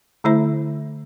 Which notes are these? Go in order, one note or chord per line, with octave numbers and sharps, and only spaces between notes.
D3 A3 E4 C5 E5